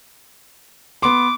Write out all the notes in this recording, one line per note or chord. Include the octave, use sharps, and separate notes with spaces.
B3 C6 D6